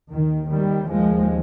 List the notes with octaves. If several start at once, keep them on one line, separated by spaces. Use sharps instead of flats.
D#2 D#3
D#3 G3
F3 G#3